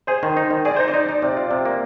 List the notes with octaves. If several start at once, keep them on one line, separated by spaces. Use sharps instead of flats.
G#4 C5
D#3
D#4
D#3
G#4 D5
D#4 C5
D5
D#4
D#4
C3 D5
F4
C3
A#3